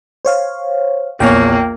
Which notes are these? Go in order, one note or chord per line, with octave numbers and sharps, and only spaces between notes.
C5 C#5 F5
A#1 E2 A#3 C#5 G5